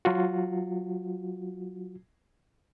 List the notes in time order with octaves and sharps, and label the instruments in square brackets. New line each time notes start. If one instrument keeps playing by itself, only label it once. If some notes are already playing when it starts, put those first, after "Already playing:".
[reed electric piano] F#3 F4 F#4